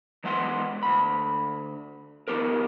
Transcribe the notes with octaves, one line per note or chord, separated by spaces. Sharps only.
E3 G#3 B3 F#5 C6
D2 B5
D#3 B3 G4 A#4